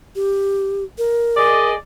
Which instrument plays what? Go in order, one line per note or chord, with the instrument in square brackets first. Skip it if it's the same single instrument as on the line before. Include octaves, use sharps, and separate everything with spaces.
[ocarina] G4
A#4
[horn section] G#4 D5 D#5